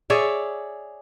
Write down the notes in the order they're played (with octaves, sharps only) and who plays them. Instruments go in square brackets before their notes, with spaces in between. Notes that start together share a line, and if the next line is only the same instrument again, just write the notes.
[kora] G#4 C#5 D5 E5